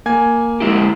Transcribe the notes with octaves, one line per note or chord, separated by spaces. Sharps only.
A#3 G#5 G#6
G#3 E4 G4